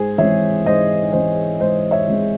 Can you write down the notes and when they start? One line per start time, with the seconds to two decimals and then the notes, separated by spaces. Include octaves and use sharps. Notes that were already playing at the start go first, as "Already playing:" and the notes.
Already playing: G#2 G#4 C5
0.18 E3 G#3 C4 C#5 E5
0.66 G#2 C5 D#5
1.13 E3 G#3 C4 C5 D#5
1.60 G#2 C5 D#5
1.91 C#5 E5
2.08 E3 G#3 C4